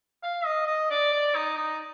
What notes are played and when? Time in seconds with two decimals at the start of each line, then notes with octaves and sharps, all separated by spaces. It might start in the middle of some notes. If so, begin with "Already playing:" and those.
0.23 F5
0.45 D#5
0.67 D#5
0.91 D5
1.12 D5
1.35 D#4
1.57 D#4